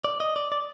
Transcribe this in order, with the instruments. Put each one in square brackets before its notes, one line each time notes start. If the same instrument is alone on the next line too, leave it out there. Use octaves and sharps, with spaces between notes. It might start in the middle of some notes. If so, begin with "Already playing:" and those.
[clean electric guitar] D5
D#5
D5
D5